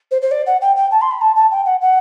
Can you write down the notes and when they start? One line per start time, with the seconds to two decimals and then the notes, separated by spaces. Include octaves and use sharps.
0.11 C5
0.21 C5
0.31 D5
0.46 F#5
0.61 G5
0.76 G5
0.91 A5
1.01 C6
1.11 B5
1.21 A5
1.35 A5
1.51 G5
1.65 F#5
1.81 F#5